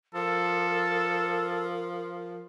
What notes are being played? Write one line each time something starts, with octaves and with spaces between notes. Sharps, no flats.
F3 A4 A#4